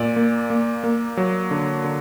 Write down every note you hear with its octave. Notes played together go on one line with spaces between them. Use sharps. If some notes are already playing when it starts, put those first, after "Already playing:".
Already playing: A#2 D5
A#3
A#3
A#3
F#3
D3
D3